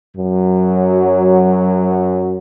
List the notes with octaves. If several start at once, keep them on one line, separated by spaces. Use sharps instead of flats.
F#2 F#3